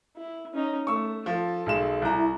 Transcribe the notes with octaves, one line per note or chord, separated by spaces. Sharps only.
E4
C#4 D#4
A3 C#6 E6
F3 A4
B1 G#3 E7
C2 E4 A#5